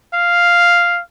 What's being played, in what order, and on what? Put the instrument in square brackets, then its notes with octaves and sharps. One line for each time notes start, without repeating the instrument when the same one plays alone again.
[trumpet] F5